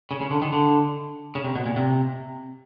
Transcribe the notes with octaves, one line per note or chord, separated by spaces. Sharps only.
C#3
C#3
D3
D#3
D3
C#3
C3
B2
A#2
C3